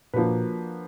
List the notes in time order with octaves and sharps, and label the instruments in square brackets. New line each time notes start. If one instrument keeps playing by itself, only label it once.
[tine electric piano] A#2 [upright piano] F3 A#3 D4 F#4 B4